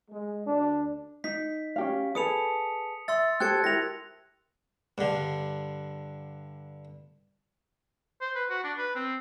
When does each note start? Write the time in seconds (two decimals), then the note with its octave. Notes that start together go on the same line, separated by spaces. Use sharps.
0.11 G#3
0.47 D2 D4
1.24 D#4 B6
1.76 C#4 G4 F5
2.15 G#4 A4 B4 D#6 C#7 F7
3.08 E5 C6 E6 A6
3.40 G4 A4 C5 F#6 G#6 C#7
3.64 E4 G4 A#4 A#6 F7
4.98 G2 D3
8.21 C5
8.36 B4
8.50 F#4
8.64 D4
8.78 B4
8.95 C4